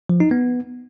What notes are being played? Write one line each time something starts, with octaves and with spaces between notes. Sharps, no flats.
F3
D#4
B3